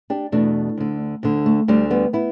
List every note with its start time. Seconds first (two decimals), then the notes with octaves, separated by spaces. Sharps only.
0.10 D4 G4
0.32 E2 B2 A3 D4
0.78 D2 D3
1.23 D2 D3
1.46 A3
1.68 D2 D3 G3
1.90 G3 B3
2.13 B3 E4